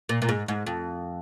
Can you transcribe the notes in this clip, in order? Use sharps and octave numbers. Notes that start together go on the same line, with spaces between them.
A#2
A#2
G#2
G#2
F2